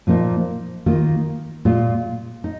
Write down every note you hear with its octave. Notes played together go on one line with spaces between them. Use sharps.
A#2 F3 A#3 D#4
D#3 A#3 F4
A#2 G#3 F4
D#4